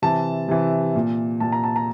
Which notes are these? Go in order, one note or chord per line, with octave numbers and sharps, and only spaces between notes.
C3 E3 A5
C3 E3
A#2
A#2 A5
A#5
A5
A#5